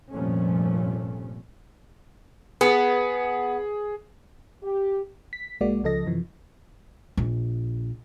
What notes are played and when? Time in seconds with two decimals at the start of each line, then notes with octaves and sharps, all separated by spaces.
0.12 F1 G2 A#2 F3 A3 C#4
2.61 B3 G#4
4.63 G4
5.33 B6
5.61 B1 G#3 A#3 F#4 D5
5.83 C#2 C#3 F3 A4 D#5 A#6
6.06 F#2 C3 E3 F3
7.17 A#1